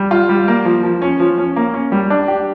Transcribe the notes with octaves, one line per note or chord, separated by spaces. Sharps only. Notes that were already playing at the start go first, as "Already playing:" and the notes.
Already playing: G3
F4
G3
A#3
F3
F3
C#4
F3
C#4
A#3
C#4
G3
D4
G4